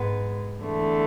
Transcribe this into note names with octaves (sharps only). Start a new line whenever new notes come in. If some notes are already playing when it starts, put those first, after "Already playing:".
Already playing: G#2 G#3 B3
E2 D3 A3